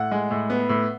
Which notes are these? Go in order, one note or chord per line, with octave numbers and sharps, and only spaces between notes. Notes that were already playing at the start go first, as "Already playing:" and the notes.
Already playing: A2 F#5
G#3
A2
B3
A2